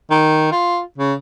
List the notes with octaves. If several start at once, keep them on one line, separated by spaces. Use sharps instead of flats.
D#3
F4
C#3